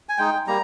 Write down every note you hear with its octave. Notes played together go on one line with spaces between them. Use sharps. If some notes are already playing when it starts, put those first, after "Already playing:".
G#5
G#3 D#4 G5
G3 A#3 A#5